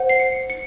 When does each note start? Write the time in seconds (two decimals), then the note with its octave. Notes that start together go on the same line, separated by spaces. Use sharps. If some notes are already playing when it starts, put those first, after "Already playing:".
Already playing: C5 F#5
0.09 C7
0.19 C#7
0.50 C#7